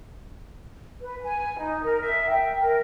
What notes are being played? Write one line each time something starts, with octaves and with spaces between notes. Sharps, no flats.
B4
G#5
D#4
A#4
E5
G5
A#4